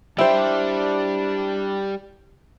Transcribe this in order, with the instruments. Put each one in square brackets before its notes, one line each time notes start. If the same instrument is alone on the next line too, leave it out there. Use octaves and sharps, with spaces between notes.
[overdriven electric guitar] G3 [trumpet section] D4 [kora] E4 [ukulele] C5 G5